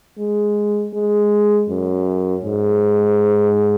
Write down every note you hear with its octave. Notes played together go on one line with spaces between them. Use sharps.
G#3
G#3
F#2
G#2